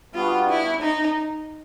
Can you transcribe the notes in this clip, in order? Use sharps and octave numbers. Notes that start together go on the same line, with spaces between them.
G3 B3 D4 F4 F#4
E4
D#4